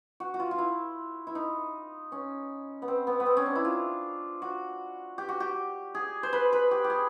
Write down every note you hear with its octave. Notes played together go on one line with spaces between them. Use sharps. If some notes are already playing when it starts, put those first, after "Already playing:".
F#4
F#4
F4
F4
E4
E4
D#4
C#4
B3
C4
B3
B3
C4
C#4
D4
E4
F4
F#4
G4
F#4
G4
G#4
C5
B4
B4
G4
G4
G#4